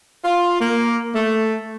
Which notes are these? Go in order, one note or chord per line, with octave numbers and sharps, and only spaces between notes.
F4
A#3
A3